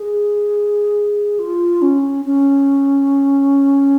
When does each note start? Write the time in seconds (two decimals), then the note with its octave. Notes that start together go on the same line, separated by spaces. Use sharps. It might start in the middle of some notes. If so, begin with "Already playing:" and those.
Already playing: G#4
1.39 F4
1.82 C#4
2.25 C#4